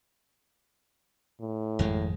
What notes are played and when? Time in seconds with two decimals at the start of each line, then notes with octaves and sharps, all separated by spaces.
1.40 A2
1.79 G#1 F2 G#3